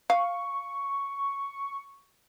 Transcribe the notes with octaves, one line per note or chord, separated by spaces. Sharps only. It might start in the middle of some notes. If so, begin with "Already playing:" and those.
F5 C#6